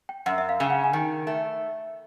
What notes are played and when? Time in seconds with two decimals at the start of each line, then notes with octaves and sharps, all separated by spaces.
0.09 G5
0.26 F#2 F#5
0.38 E5
0.49 F5
0.60 C#3
0.66 G5
0.70 F#5
0.84 G#5
0.93 D#3 G5
1.27 A3